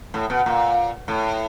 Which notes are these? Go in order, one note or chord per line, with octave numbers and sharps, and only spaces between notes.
A2
B2
A#2
A2